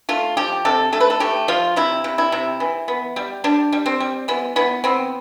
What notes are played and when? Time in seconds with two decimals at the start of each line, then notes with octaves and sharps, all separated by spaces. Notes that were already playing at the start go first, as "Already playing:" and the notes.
0.09 A3 F4
0.37 F3 G4
0.65 C3 A4
0.92 A3 A4
1.00 B4
1.10 A4
1.20 A3 G4
1.48 F3 F4
1.76 C3 E4
2.04 C3
2.18 E4
2.32 C3
2.60 E3
2.88 B3
3.16 G3
3.44 G3 D4
3.73 G3
3.86 C4
4.00 G3
4.28 E3 B3
4.56 E3 B3
4.84 B3 C4